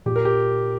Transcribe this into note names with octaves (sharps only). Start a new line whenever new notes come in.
A#2 G4
A#4
G4